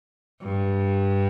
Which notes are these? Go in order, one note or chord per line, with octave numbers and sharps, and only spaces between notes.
G2